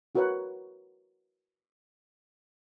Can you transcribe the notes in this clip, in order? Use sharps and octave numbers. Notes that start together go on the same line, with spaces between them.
E4 F#4 A#4 B4 C#5 F#5